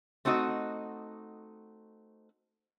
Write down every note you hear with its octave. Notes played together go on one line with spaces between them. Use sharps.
A3 C4 D#4 F#4 D#5